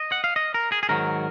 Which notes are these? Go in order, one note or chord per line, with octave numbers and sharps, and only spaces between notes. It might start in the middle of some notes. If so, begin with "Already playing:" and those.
Already playing: D#5
F#5
F5
D#5
A#4
G#4
G#4
G#2 D#3 F#3 A#4